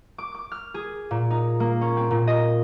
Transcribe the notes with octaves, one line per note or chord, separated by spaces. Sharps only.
D6
D6
F6
G#4
A#2
D#4
A#3
C#4
C4
A#2
D#5